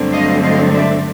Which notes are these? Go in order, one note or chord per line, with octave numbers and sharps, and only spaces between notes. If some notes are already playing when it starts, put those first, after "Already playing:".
Already playing: G2 D3 F#3 A3 C4
D#5 F5
D#5 F5
D5 E5